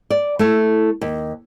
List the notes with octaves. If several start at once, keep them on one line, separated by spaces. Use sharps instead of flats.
D5
A3 E4
D#2